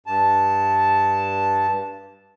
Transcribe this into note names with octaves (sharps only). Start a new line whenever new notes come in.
G2 A5